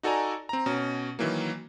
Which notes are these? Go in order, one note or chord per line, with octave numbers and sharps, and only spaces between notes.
D#4 F#4 A4 D5 G#5 A#5
C4 A#5
B2 C#4
D#3 E3 F#3 A#3